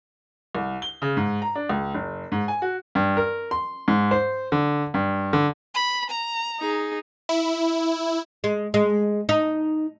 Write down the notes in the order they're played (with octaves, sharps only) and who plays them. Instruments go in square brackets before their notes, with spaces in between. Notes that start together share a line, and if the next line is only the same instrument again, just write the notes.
[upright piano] C2
G7
C#3
G#2
A#5
D4
C#2
F#1
G#2
G#5
F#4
[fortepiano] G2
A#4
C6
G#2
C5
D3
G2
D3
[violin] B5
A#5
[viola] D#4 G#4
[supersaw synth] E4
[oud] G#3
G#3
D#4